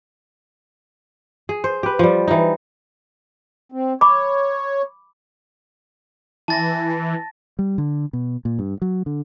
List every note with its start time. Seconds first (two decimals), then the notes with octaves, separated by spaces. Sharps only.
1.49 G#4
1.64 C5
1.83 G4 B4
1.99 F3 G3
2.27 E3 D#4
3.72 C4
4.01 C#5 B5 D6
6.48 E3 A5 A6 A#6
7.59 G3
7.78 D3
8.13 B2
8.45 A#2
8.59 G2
8.82 F#3
9.06 D3